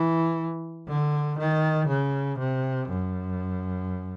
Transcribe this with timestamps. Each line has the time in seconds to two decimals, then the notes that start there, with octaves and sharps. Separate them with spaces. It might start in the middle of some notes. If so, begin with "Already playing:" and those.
Already playing: E3
0.88 D3
1.39 D#3
1.88 C#3
2.39 C3
2.89 F#2